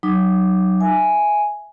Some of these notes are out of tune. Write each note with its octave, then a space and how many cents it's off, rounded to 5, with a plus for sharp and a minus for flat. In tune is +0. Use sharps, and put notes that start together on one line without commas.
F#3 +15 D#4 -25 D6 +0
E5 +5 G#5 +0